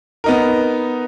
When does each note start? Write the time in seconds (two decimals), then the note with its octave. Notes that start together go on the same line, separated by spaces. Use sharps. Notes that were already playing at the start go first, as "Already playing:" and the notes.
0.24 B3 D#4 A#4